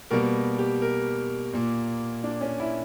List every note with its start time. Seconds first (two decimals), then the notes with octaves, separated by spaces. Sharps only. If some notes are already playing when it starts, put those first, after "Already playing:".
0.11 B2 G3 A#3 A#4
0.58 G4
0.82 A#4
1.53 A#2 A#3
2.24 D4
2.41 C#4
2.60 E4